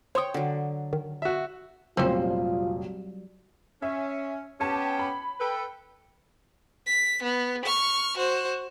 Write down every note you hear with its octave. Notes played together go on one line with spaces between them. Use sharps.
C5 C#5 G5 C6 D#6
D3 F#3
D#3
F#4 E5
F1 A#1 F#3 G3 C4 C#4 F4 C5
C#4 E5
B3 C#4 G4 A5
B5
A4 B4 G5
B6
B3
C#6 F6
F#4 C5